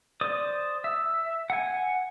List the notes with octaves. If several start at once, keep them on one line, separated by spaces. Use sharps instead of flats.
C5 D5 D#6
E5
F#5 G#5